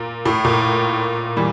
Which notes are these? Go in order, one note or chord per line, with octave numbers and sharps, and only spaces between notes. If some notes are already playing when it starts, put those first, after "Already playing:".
Already playing: A#2
A2
A#2
E3 G3